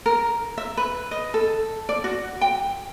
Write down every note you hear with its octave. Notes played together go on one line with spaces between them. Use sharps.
A#4
E5
B4
D#5
A4
D5
F#4
G5